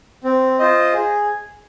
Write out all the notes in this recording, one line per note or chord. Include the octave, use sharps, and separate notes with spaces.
C4
F4 C5 D#5
G#4